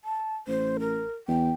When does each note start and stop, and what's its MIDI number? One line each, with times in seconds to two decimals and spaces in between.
0.05 0.35 81
0.48 1.06 33
0.48 0.78 72
0.80 1.13 70
1.28 1.52 40
1.28 1.54 79